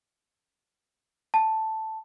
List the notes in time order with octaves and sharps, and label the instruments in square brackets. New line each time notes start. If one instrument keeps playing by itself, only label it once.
[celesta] A5